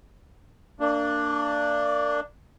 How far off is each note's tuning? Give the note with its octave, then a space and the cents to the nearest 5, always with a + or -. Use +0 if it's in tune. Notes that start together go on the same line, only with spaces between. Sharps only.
A#3 -30 D4 +0